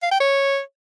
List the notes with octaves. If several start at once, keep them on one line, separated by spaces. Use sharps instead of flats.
F5
G5
C#5